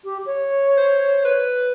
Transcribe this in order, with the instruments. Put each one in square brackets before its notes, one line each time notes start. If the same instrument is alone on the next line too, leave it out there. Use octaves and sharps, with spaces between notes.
[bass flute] G4
C#5
[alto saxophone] C5
B4